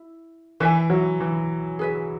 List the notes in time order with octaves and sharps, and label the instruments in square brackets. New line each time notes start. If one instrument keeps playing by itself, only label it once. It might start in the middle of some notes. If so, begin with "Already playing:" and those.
Already playing: [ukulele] E4
[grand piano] E3 [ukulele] B4 E5 G#5
[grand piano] F#3
E3
[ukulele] G#4 B4 E5